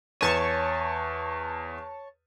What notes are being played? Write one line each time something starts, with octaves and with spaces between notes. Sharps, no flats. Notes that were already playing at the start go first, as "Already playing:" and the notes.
E2 C#5 A5 C#6 D#7